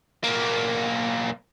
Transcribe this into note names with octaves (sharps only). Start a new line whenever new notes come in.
B1 A#3